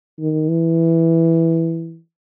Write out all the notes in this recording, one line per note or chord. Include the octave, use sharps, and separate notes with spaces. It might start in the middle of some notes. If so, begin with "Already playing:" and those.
D#3
E3